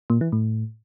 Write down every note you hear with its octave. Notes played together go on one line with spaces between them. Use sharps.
A#2
E3
A2